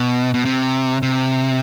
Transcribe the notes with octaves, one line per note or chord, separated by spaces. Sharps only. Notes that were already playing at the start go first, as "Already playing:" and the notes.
Already playing: B2
B2
C3
C3